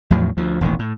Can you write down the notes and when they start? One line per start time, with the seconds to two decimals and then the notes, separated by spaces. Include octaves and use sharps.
0.10 E2 A2 F3 F#3
0.37 D2 F3
0.61 E1 A1 A#2 D#3
0.79 A2